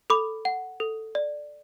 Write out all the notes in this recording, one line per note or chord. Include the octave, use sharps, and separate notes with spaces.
A4 B5 D6
F#5
A4
D5